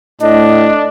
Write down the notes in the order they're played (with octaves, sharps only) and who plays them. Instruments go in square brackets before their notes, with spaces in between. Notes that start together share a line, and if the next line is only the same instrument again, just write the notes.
[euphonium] A2 [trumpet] D4 [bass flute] D#5